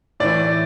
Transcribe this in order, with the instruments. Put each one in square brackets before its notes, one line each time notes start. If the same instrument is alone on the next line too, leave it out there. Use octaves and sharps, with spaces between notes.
[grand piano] A2 E3 D5